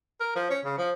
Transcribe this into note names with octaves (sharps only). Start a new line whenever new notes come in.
A#4
F3
C#4
C#3
F3